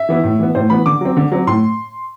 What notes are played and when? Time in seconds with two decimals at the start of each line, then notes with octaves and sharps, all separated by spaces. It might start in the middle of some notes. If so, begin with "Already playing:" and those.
Already playing: E5
0.09 E3 B3 E4
0.24 A2
0.39 E3 B3
0.55 A2 C5
0.70 E3 B3 B5
0.86 D3 D6
1.01 F#3 C4
1.17 D3
1.32 F#3 C4
1.47 A2 C6